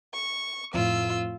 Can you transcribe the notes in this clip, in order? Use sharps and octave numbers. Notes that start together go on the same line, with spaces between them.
C#6
F2 A2 F4 E6